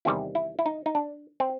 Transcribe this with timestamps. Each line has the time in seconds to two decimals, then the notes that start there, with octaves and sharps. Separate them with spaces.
0.05 E2 C3 D#3 G3 E4
0.35 E4
0.59 E4
0.66 D#4
0.86 D#4
0.95 D4
1.40 C4